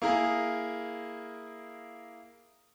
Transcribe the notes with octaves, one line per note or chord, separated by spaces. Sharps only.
A#3 E4 G#4 A#4